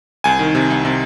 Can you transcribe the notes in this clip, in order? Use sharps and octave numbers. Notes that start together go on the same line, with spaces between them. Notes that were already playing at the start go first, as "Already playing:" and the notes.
C2 G#5
D#3
C3
C2
C3